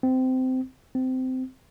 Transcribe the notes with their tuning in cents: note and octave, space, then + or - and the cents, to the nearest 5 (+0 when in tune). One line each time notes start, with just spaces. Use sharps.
C4 -20
C4 -20